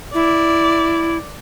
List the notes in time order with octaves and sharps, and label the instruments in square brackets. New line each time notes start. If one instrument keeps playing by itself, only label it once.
[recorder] E4 [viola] D5